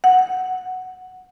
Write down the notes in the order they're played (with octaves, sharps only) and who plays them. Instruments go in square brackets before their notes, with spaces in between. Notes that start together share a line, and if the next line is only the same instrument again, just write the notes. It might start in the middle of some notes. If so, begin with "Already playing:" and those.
[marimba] F#5